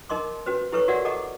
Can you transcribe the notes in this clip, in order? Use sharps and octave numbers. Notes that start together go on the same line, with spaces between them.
D#4 A#4 D#5 C6 D6
C#4 F#4 B4 C5
E4 G4 A4 B4 C#5 C#6
F#4 A#4 D5 E5 F#5
G4 A4 D#5 F#5 A#5 D6